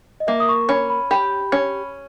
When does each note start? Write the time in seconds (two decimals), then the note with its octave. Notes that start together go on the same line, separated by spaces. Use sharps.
0.20 D#5
0.27 A#3 E5
0.40 D#6
0.49 C#6
0.69 C#4 B5
0.90 B5
1.11 G4 B5
1.52 C#4